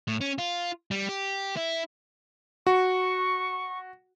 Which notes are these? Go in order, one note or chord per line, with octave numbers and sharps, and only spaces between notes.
A2
C#4
F4
G3
G4
E4
F#4 C#6